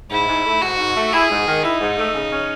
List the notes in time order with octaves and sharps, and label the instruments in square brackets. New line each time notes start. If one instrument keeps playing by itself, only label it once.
[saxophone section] G#2 [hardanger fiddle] E4
[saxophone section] G#2
A3
[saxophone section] G#2 [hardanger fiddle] F#4
[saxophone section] G#2
A3
[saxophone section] E4 [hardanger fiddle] G#4
[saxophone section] G#2
D#3
[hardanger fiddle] D#4 [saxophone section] E4
[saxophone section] G#2
A3
C#3
C#4